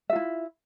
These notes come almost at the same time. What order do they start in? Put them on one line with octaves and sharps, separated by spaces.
E5 F4 E4